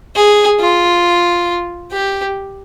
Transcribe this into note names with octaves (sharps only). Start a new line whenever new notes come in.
G#4
F4
G4